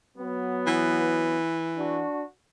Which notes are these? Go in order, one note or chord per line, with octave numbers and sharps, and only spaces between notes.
F#3 B3
E3
D4 F#4